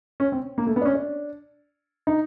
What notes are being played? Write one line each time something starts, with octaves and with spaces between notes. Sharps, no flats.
C#4
C4
A#3
A3
B3
D4
C#4
D4
D#4